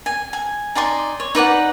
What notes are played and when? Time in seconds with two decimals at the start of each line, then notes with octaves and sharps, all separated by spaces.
0.06 G#5
0.33 G#5
0.75 D#4 D5 G#5 C6
1.20 C#5
1.35 D#4 B4 D5 F#5